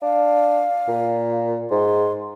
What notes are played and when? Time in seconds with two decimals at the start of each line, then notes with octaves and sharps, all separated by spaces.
0.02 D4 F5
0.88 A#2
1.71 G#2 C6